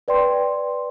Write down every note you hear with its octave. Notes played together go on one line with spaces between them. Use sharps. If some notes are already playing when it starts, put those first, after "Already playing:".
B4 D5 G5 C6